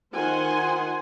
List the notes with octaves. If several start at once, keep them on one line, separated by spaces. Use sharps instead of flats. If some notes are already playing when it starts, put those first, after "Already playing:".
D#3 F4 C5 F#5 G#5 C6